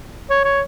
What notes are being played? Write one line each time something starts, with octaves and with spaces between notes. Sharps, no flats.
C#5
C#5